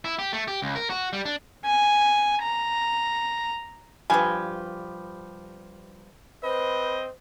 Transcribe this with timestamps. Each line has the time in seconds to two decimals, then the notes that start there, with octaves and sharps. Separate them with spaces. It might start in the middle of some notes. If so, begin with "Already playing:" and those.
0.05 E4
0.19 G4
0.33 A3
0.48 G4
0.62 C#2
0.76 A#4
0.90 F#4
1.13 G3
1.25 D4
1.65 G#5
2.43 A#5
4.10 G2 F3 G4 B4 G#5
6.44 C4 B4 C5 D#5